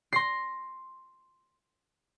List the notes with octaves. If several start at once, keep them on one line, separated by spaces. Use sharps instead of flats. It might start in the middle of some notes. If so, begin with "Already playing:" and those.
C6 A#6 C7